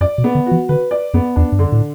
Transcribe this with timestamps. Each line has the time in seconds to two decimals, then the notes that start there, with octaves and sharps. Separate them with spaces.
0.01 F#2 D5
0.18 B2
0.24 B3
0.35 D3
0.46 F#4
0.51 E3
0.69 D3 B4
0.91 D5
1.14 F#2 B3
1.36 E2 D4
1.52 G2
1.59 F#2 D3
1.72 A2